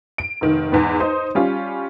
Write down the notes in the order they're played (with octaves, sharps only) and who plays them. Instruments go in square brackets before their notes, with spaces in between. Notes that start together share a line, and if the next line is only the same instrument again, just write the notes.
[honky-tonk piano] D7
F1 D#3
E2 G#2 B3
D#4 C5
G3 C#4 F4